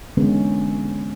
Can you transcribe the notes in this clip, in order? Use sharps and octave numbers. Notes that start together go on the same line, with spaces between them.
D3 E3 G#3 A#3 B3 C#4